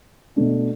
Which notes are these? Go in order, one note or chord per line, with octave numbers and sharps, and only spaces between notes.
B2 A3 D4